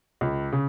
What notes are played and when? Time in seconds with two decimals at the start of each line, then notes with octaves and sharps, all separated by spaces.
0.21 C#2
0.52 C#3